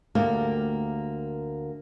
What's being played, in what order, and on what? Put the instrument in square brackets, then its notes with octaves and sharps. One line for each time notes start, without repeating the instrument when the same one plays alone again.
[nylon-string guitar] D2 A#3 G4 A#4